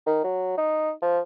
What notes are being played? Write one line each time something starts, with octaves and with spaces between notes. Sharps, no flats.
D#3
F#3
D#4
F3